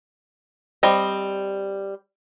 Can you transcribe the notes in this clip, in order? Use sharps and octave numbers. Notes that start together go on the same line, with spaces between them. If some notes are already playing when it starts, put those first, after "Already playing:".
G3 C4 D#5